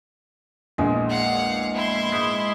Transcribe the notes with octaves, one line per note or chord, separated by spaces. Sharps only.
A#1 E2 A#2 G#3
F5 F#5
E4 C6
G#2